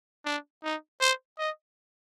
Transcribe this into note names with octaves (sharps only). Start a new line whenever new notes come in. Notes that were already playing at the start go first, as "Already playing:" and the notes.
D4
D#4
C5
D#5